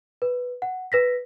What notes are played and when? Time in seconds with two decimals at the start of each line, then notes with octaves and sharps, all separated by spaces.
0.22 B4
0.62 F#5
0.92 B4 A#6 B6